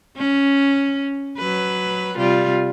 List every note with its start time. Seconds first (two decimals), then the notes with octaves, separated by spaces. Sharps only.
0.17 C#4
1.37 F#3 B4
2.17 C3 G3 F4